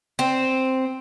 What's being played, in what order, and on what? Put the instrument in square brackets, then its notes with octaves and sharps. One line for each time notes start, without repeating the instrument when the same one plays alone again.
[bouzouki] C4